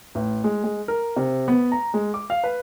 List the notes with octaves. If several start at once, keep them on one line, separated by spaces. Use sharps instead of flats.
A1
G#3
G#3
A#4
C3
B3
A#5
G#3
D6
F5
B4